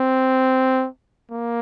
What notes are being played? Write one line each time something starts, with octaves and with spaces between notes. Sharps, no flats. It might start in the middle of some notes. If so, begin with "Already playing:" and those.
Already playing: C4
A#3